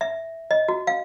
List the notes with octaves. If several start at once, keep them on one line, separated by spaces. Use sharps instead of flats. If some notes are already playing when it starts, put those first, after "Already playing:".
E5
D#5
F#4
F5